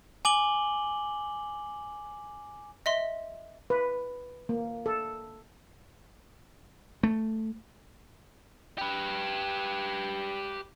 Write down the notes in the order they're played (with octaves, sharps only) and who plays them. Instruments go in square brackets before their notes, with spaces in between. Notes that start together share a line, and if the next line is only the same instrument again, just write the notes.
[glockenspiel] G#5 D6 F#7 G7
[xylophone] D#5 E5 C6
[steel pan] B4
A#3
A4
[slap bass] A3
[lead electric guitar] G4 B4